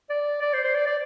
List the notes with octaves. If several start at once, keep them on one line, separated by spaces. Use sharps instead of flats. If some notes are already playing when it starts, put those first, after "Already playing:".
D5
D5
C5
C5
D5
D5